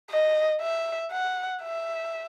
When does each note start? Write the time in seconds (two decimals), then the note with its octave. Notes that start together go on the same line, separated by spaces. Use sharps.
0.11 D#5
0.62 E5
1.12 F#5
1.63 E5